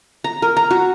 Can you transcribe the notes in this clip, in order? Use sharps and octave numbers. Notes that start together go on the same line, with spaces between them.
A#5
A#4
A#5
F#4